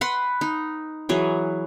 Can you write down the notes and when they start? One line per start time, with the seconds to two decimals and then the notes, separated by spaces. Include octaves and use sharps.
0.01 B4 F#5 B5 C6
0.41 D#4
1.09 E3 F#3 G#4